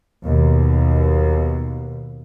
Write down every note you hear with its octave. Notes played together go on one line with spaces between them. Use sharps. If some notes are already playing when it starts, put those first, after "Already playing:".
D#2 B2